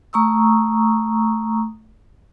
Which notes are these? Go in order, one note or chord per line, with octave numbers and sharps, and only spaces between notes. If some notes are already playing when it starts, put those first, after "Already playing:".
A3 A#5 C#6 D#6 E6